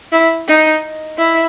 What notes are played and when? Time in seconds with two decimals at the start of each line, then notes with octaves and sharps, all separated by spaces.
0.12 E4
0.48 D#4
1.18 E4